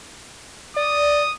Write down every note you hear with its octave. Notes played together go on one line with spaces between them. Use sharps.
D5 D#6